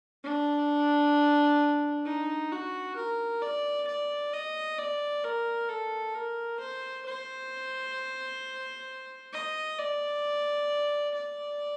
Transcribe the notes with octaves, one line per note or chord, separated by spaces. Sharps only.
D4
D#4
F#4
A#4
D5
D5
D#5
D5
A#4
A4
A#4
C5
C5
D#5
D5
D5